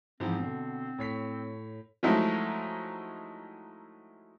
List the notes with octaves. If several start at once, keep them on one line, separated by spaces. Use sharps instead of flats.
G#2 E3 F3 C4
B2 D3
A2 C#5 B6
F3 F#3 G#3 A3 D#4 E4